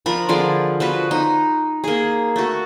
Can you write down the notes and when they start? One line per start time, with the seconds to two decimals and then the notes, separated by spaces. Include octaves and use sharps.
0.06 F3 D4 A#4 B5
0.29 D3 F3 G#4 D5
0.80 F3 F#4 B4
1.11 D#4
1.84 A#3 G#4
2.36 A3 F#4